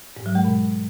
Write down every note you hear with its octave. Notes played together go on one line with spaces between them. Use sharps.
G#2
F#3
G#3
B2